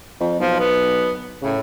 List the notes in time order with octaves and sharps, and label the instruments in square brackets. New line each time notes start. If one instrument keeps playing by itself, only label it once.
[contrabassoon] F2
[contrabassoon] B1 [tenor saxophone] F3
[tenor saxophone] B3
[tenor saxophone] A2 [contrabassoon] C#3